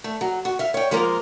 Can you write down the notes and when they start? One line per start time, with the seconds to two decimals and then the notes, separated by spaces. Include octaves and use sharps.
0.04 A3
0.21 F#3
0.45 F#4
0.59 E5 F5
0.74 C#5 G5
0.91 F3 G#3 A#3 F4 A#4